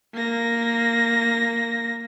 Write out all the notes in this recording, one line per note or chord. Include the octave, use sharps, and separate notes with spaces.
A#3 A#6